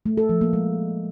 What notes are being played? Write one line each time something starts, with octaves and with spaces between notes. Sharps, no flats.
A3
A4
F3
A#3
G#3